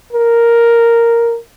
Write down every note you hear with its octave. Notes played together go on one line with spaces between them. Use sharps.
A#4